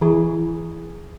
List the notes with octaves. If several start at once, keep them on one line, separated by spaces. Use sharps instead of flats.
E3 G#4